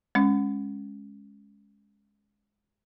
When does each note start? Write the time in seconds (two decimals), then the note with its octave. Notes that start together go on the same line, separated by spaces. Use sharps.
0.15 G#3 C#4